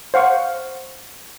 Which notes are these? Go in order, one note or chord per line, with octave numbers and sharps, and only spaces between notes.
C5 F5 F#5 C#6